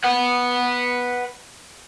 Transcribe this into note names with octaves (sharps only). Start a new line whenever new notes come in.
B4 F#5